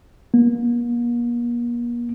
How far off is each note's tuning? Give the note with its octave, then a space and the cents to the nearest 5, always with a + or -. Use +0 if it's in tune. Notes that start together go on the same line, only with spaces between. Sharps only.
A#3 +40